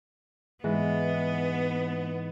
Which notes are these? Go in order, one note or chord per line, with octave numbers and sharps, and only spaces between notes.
G#2 E3 B3